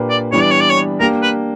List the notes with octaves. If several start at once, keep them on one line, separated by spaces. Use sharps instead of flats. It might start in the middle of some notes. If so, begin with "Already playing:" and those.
Already playing: A#2 A#3 D4 G4 B4
D5
E3 G3 B3 D4 C#5
D5
C#5
D5
C#5
A#3 D4 G4 A#4
B4